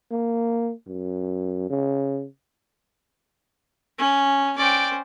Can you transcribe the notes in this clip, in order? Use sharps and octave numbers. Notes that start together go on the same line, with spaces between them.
A#3
F#2
C#3
C#4
C#4 C5 D5 G5